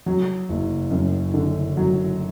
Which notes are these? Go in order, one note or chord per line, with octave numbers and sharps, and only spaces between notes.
F#3
F#1
F#2
D3
F#3